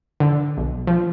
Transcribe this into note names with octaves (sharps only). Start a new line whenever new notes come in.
D3
B1
F3